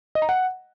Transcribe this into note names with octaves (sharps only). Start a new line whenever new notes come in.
D#5
A#5
F#5